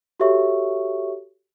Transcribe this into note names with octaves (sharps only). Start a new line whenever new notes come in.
F#4 G4 A4 C#5 E5 C#6